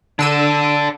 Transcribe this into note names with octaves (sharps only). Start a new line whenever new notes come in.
D3 D4 A4 E6 D#7